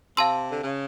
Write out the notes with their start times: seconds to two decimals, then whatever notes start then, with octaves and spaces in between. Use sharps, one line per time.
0.17 C3 F5 A5 C6 E6
0.51 D3
0.64 C#3